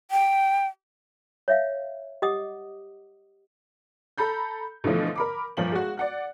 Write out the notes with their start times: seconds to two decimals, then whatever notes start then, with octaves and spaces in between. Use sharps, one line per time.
0.11 G5
1.48 C#5 E5 F5
2.22 G4 D#5 F#5 D6 D#6
4.18 A4 A#5 B5 G6
4.84 B2 D3 E3 F3 A3
5.15 A#4 B5 D6
5.57 G1 A#2 F3 F#7
5.72 G#3 F#4
5.97 D5 F#5 F#6